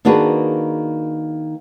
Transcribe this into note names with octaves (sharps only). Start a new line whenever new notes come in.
D#3 A#3 D4 F#4 G#4 B4